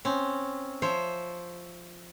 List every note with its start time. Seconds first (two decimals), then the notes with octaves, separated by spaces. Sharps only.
0.05 C4 C#4
0.82 F3 C5 C#5 E5